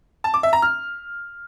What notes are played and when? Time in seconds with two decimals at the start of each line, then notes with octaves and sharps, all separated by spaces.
0.24 A5
0.34 D6
0.43 E5
0.53 A#5
0.62 F6